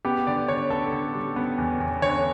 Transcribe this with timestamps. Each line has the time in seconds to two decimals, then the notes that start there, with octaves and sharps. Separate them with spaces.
0.05 B3 G4
0.27 D3 D5
0.48 D3 C#5
0.70 B3 A4
0.92 D3
1.14 G3
1.36 B3
1.58 E2
1.80 E2
2.02 D3 C#5